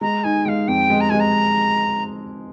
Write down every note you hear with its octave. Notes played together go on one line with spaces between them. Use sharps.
G#3 A#5
D#4 G#5
G#3 F5 G5
F2 G5
G#3
A#5
G#3 G#5
A#5